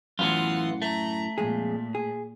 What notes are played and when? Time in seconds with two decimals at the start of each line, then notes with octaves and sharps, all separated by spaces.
0.19 F#2 A2 E3 B3 F4 F#5 C6
0.82 A3 A#5
1.38 F2 A#2 G#3 G#4
1.95 G#4